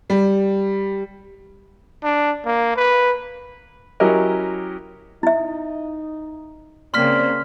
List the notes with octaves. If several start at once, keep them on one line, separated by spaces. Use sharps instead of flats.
G3
D4
A#3
B4
F#3 C#4 E4 G4 A#4 D#5
D#4 E4 E5
C#3 A#3 C4 D5 C6 F6 B6